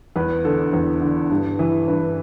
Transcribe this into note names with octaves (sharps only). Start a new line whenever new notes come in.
E2 B4
D3 A4
E2
D3
G2
E3
G2 B4